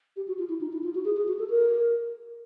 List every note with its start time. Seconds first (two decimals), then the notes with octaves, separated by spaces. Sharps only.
0.16 G4
0.28 F#4
0.38 F4
0.49 E4
0.61 D#4
0.73 E4
0.83 F4
0.95 F#4
1.05 G#4
1.16 G#4
1.28 F#4
1.39 A4
1.50 A#4